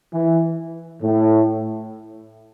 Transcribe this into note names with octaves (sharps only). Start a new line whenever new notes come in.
E3
A2